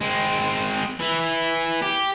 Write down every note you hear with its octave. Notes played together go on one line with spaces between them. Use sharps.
G#3 C4
E3 E4
G4